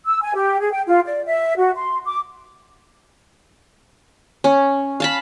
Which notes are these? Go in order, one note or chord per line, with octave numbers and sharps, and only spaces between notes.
E6
G#5
G4
G#4
G5
F4
D5
E5
F#4
C6
D6
C#4
F5 A5 B5